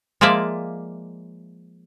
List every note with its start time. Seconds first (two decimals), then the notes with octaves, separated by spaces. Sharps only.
0.21 F3 G#3 A#3 D5 E5